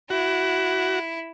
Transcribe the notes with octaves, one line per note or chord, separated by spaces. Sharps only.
E4 F#4